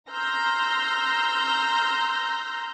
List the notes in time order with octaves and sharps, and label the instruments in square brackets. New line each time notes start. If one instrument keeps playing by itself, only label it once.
[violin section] A#5 C6 E6 F6 G6 A#6